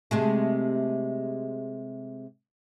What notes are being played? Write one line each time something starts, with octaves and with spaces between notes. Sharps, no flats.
C3 G#3 A3